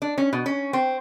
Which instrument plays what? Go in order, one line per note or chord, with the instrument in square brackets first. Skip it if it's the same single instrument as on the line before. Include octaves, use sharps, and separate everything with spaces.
[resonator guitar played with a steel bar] D4
C#4
B2
C#4
C4